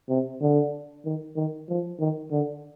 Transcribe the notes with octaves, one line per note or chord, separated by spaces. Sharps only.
C3
D3
D#3
D#3
F3
D#3
D3